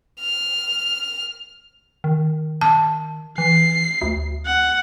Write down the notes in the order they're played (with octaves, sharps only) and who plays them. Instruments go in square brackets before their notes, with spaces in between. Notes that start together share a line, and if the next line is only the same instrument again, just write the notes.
[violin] F6
[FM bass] D#3
[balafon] A5
[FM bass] E3 [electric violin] C7
[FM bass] D2
[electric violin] F#5